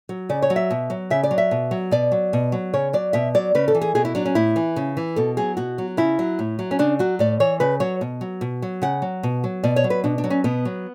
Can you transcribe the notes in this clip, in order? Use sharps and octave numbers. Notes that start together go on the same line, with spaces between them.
F#3
C#3 D5
C#5
F#3
E5
B2
F#3
C#3 E5
D5
F#3
E5
B2
F#3
B2 D5
F#3
B2
F#3
C#3 C#5
F#3 D5
B2 E5
F#3 D5
C#3 B4
A4
E3
G#4
B2 G#4
E4
F#3 D4
C#4
A2 E4
E3
C#3
E3
B2 A4
F#3 G#4
B2 F#4
F#3
C#3 E4
F#3
A2
F#3
C#4
C#3 D4
F#3 F#4
A2 D5
E3 C#5
C#3 B4
F#3 C#5
B2
F#3
B2
F#3
C#3 F#5
F#3
B2
F#3
B2 D5
C#5
F#3
B4
B2 D4
D4
F#3
C#4
B2 B3
F#3